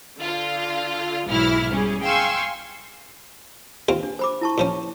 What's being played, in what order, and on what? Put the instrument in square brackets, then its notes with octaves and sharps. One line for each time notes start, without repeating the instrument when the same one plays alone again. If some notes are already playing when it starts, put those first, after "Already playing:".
[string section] D3 F4
B1 G#2 E3 F#3 E4 F6
G3 C#4 G#4
F5 G5 G#5 C6 C#6 E6
[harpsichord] D#2 C4 F4
[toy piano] D4
C5 B5 D6
E4 A5 C#6
[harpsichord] A#2 F3 C#4